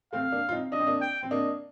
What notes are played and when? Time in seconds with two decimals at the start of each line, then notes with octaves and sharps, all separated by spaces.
0.12 A3 C4 F5
0.32 A#3 D4
0.49 F4
0.52 C4 D#4
0.72 D4 D#5
0.80 C4
0.87 A#3 D4
1.01 G5
1.23 C4
1.31 A#3 D4 D#5